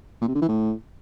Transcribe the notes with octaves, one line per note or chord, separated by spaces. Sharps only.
A#2
C3
D3
E3
A2